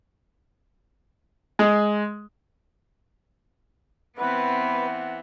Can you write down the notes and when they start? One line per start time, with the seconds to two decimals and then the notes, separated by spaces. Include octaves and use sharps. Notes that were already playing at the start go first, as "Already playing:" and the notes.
1.59 G#3
4.18 E3 B3 C4 B4 F#5